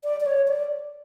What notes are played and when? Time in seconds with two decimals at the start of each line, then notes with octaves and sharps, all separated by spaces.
0.04 D5
0.20 D5
0.26 C#5
0.48 D5